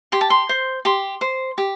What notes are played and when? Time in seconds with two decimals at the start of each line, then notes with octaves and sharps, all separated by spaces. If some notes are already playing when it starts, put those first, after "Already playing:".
0.12 G4 C6
0.21 A5
0.30 C6
0.49 C5
0.85 G4 C6
1.21 C5
1.58 G4